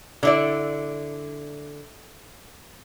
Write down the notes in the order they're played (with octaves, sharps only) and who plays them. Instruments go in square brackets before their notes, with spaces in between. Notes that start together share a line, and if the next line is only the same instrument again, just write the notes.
[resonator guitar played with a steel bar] D3 E4 D5